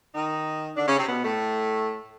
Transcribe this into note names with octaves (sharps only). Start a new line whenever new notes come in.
D#3 D#4
D3 D4
C#3 C#4
C3 C4
B2 B3
A2 A3